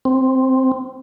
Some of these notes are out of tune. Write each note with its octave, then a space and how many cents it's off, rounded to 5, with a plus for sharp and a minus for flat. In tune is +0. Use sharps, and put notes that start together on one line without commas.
C4 +0